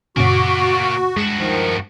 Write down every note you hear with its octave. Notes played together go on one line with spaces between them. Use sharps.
F#2 A#2 C#3 A#3 F#4 D5
G2 G#3 F#4 E7
D#3 F3